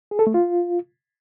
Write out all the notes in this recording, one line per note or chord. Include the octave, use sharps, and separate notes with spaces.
G#4
A4
A3
F4